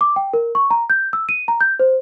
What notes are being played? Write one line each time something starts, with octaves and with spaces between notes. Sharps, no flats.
D6
G5
A#4
C#6
A#5
G6
E6
D#7
A#5
G6
C5